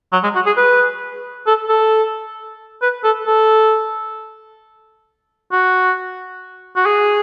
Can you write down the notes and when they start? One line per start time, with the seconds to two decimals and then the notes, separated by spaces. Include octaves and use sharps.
0.12 F#3
0.23 G#3
0.35 F#4
0.46 G#4
0.57 B4
1.47 A4
1.69 A4
2.82 B4
3.04 A4
3.27 A4
5.52 F#4
6.76 F#4
6.86 G#4